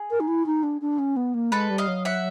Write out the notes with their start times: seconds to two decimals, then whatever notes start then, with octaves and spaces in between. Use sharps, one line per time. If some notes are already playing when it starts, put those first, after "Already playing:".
Already playing: G#4
0.11 A#4
0.20 D#4
0.28 E4
0.46 D#4
0.63 D4
0.81 D4
0.99 C#4
1.16 B3
1.34 A#3
1.52 G#3 A4 B4
1.70 G3
1.78 D#5 F5
1.88 F#3
2.05 E5 F#5